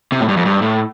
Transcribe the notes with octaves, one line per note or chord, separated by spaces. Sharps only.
C3
A2
G2
F2
G2
A2